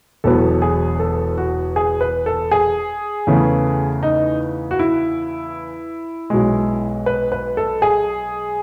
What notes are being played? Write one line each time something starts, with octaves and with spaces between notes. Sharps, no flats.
E1 E2 B2 F#3 B3 A4
G#4
A4
F#4
G#4
B4
A4
G#4
E2 C#3 E3 A3
D#4
F#4
E4
B1 B2 G#3
B4
B4
A4
G#4